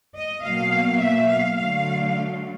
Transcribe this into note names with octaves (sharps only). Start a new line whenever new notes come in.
D#5
B2 F#3 A#3 F5
E5
F5
D3 F#3 A3 F5